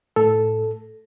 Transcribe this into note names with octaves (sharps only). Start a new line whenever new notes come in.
A2 A4